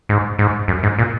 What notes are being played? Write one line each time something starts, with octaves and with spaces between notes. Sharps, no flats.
G#2
G#2
F#2
G#2
A#2